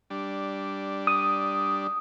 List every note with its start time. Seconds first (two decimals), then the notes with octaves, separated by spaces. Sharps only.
0.10 G3 D4
1.07 D#6